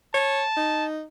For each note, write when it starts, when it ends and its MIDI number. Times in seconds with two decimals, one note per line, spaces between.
0.14 0.43 73
0.14 0.85 81
0.57 1.04 63